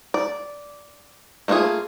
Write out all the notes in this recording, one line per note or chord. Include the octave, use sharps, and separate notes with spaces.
D5
A3 A#3 D4 F4 G#4